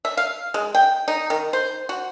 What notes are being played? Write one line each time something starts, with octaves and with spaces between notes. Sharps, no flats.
E5
F5
G#3
G5
D#4
D#3
C5
F#4